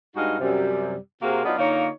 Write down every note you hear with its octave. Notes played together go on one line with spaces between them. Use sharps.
G2 G#3 D#4 F#4 D#5 F5
F#2 C3 G3
C3 A#3 C4 F#4 G#4 A#4
F#3 B3 D4 D#4 F4
D3 A#3 D#4 F4 C#5